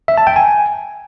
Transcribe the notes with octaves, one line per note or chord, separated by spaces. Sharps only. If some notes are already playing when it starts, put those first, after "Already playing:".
E5
A5
G5
G#5